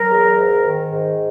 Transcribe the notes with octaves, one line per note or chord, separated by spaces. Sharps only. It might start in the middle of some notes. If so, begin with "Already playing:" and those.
Already playing: F#3 A#4
E2
G#2
D#3
G#2